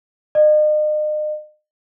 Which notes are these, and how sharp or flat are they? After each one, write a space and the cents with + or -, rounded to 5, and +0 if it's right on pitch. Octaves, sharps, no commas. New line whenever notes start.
D#5 -40